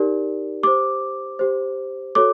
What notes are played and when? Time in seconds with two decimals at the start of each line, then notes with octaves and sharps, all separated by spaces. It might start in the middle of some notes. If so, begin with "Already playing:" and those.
Already playing: D#4 G4 A#4 D5
0.63 G4 C5 D6
1.39 G4 C5
2.15 F#4 A4 C#5 D6